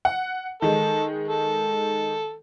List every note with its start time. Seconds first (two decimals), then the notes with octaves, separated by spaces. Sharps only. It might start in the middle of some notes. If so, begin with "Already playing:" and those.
0.05 F#5
0.62 D#3 G#3 A4
1.28 A4